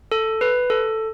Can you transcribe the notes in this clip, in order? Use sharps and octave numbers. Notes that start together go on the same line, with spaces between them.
A4
B4
A4